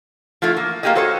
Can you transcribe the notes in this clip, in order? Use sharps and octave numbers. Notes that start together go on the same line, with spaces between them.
F3 A3 E4 F4
A#3
A#3 B3 G4 G#4 D#5
F#4 A4 C5 C#5 D#5